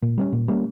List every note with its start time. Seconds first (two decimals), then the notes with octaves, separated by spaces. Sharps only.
0.02 A#2
0.18 G3 A#3 C#4
0.32 A#2
0.48 G3 A#3 C#4